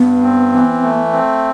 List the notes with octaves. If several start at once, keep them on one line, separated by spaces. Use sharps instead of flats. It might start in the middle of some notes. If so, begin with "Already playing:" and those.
Already playing: G2 B3
C4
E3
A3
C4